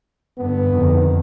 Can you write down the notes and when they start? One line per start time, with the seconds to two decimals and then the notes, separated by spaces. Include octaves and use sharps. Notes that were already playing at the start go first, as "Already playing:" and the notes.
0.38 G2 D3 B3
0.68 F2 D3 D#3